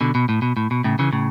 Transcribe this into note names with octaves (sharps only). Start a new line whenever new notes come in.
B2 D3
B2
A2
B2
A2
B2
A2 C#3
C#3 E3
A2 C#3